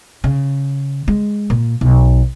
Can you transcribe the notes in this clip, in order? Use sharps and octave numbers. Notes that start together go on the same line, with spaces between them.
C#3
G#3
A#2
B1